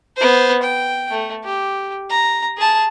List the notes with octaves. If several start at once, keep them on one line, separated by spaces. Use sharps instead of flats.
B3 C5
G5
A3
G4
A#5
G#4 A5